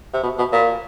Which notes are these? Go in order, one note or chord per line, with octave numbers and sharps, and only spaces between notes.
C3
B2
B2
A#2